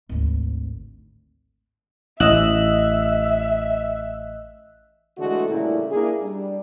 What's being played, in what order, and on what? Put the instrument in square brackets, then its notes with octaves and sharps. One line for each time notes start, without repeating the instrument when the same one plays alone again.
[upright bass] G#1 D2
[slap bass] A1 [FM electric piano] D#5 E6 F#6 [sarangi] E5
[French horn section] D3 E3 G#3 A3 D4 F#4
A#2 C#3 G3 A3 C#4 E4
A#3 D4 E4 G#4
G3 D4